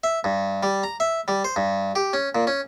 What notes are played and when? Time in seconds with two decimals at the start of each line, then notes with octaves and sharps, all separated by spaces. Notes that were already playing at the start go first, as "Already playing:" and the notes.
0.04 E5
0.24 G2
0.63 G3
0.83 A#5
1.00 E5
1.28 G3
1.44 C5
1.56 G2
1.96 G4
2.13 C#4
2.35 A#2
2.47 C#4